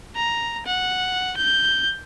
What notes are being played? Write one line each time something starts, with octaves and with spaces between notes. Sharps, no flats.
A#5
F#5
G6